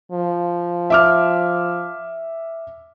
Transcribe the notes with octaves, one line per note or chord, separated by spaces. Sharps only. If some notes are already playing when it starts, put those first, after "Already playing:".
F3
E5 D6 F6